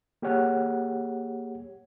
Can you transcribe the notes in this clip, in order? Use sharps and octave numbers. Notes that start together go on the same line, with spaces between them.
A#3 G4 G#4 C#5 F#5